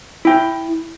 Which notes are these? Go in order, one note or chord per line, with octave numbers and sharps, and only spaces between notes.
E4 G5